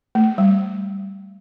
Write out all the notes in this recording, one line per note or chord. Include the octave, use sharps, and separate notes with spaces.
A3
G3